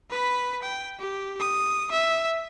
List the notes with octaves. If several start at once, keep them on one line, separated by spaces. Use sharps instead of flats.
B4 B5
G5
G4
D#6
E5